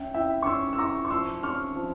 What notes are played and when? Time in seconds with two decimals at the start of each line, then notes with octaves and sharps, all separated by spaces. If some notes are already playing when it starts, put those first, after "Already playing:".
Already playing: C#4 E5 G5
0.14 E4 E5 G5
0.43 C#6
0.46 C#4 C6 E6
0.73 E6
0.78 E4 A#5 C#6
1.05 C#6
1.10 F3 C6 E6
1.43 C#4 C#6 F6
1.76 F3